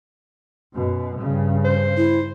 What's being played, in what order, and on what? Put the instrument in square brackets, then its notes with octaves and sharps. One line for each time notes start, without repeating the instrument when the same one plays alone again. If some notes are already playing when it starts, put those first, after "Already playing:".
[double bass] F#2 B2
G2 C#3
[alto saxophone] C5
[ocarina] E4